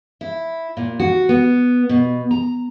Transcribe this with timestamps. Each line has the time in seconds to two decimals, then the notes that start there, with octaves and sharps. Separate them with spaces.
0.21 E4
0.77 A#2
1.00 F#4
1.29 B3
1.89 B2
2.31 A#5